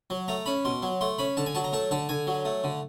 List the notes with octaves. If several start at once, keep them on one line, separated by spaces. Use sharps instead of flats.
F#3
A3 A#5
C#4 B5
B2 C6
F#3
A3 C6
C#4 B5
D3 A5
G#5
F#3 A5
A#5
A3 A5
D3 A5
D3 G#5
F#3
A3
D3